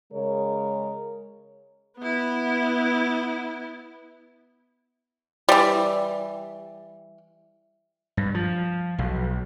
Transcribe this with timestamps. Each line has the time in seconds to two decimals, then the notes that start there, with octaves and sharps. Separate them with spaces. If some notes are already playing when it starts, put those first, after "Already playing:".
0.13 C#3 G#3 A#4 C#5
1.98 B3 E4
5.49 E3 G3
8.17 G2
8.34 F3
8.98 B1